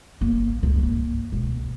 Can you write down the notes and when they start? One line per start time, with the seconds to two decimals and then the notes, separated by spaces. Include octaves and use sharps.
0.21 G1 A#3
0.63 C#2 G2
0.83 A#3
1.32 C#2 B2